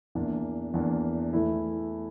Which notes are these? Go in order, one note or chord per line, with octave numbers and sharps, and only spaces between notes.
E2 E3 A#3 D4
E2 E3 A#3 D4
E3 A3 E4